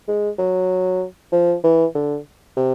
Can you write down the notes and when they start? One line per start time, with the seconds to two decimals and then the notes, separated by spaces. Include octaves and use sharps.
0.08 G#3
0.38 F#3
1.32 F3
1.64 E3
1.95 D3
2.57 C3